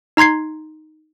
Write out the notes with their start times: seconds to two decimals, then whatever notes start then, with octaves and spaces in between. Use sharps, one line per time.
0.17 D#4 A#5 C6 G#6 C7